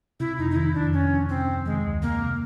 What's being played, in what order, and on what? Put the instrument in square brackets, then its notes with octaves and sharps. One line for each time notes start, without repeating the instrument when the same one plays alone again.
[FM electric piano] C3 [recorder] E4
[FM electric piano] F2 [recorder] D#4
[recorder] D#4
[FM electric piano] D#3 [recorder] E4
[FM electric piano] F2 [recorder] D4
[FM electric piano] F2 [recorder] C#4
[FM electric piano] C3
[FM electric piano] C3 [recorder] C4
[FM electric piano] F2
[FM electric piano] D#3 [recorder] G#3
[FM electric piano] D2
[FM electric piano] C3 [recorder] A#3
[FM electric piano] C3